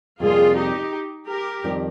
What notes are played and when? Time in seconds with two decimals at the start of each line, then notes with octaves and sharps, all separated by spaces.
0.20 F2 C3 G3 A#3 F4 G#4
0.56 D#4 G4
1.28 G4 A#4
1.64 F2 D#3 G3